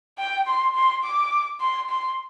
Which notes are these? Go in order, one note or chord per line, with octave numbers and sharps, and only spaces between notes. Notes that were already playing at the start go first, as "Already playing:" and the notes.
G5
C6
C6
D6
C6
C6